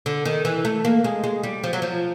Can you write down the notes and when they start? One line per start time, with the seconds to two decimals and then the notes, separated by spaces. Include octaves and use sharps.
0.06 D3
0.25 D#3
0.45 E3
0.65 A3
0.85 A#3
1.04 G#3
1.24 G#3
1.43 G3
1.64 F3
1.73 F#3
1.82 F3